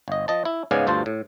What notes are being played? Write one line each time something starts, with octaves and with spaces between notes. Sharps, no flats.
G1 D#5
F3 D#5 A5
E4
G#2 C#3 B3 D5 F5 G#5
D2 G2 F4 C5 A5
A2